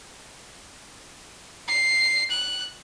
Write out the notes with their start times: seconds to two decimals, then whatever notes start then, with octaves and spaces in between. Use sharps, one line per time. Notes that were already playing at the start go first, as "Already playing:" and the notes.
1.68 C7
2.30 F#6